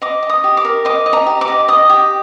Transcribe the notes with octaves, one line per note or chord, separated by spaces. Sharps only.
D#5 D6
D#5
D#6
G4
D6
A#4
D#5 D6
D#5
A#5
G4
D6
D#5
D#5 D#6
G4